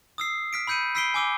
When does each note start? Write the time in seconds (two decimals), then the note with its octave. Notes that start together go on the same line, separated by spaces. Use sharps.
0.18 D#6 E6 C7
0.53 F6 B6 D7
0.67 B5 E6 G6 C#7 D#7
0.95 B5 E6 B6 C7 D7 G7
1.14 G#5 D6 E6 G7